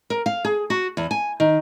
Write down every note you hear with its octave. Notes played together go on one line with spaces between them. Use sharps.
A#4
F5
G#4
F#4
E2
G#5
D#3